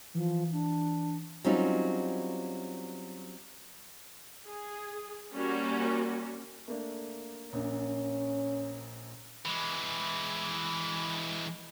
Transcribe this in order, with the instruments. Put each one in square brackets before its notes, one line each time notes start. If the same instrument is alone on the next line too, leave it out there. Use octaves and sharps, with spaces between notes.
[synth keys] E3 [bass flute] F3
[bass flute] D4
[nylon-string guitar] F#3 G3 C4 C#4 D#4 F4
[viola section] G#4
G3 A#3 C#4 F#4
[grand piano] A3 A#3 D4
[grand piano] A#1 A#3 [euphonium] C#4
[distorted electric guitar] E3 G#3 [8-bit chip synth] B5